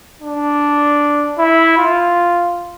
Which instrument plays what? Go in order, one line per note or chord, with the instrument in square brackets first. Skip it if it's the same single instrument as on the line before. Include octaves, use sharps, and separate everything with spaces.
[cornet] D4
E4
F4